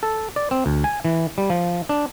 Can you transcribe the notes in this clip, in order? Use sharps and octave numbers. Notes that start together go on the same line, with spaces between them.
A4
D5
C4
D2
G#5
E3
G3
F3
D4